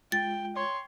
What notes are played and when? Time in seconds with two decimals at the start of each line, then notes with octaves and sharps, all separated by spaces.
0.12 G#3 F4 G5 A6
0.56 C#5 C6